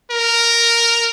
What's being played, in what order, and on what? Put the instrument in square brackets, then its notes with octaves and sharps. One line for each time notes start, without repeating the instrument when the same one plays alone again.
[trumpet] A#4